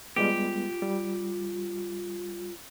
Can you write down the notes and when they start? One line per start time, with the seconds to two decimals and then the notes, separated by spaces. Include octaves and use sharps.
0.16 G3 G#3 B3 F4 G4
0.82 G3